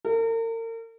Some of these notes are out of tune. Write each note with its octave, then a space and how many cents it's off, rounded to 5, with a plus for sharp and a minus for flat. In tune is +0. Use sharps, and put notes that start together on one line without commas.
A#4 -40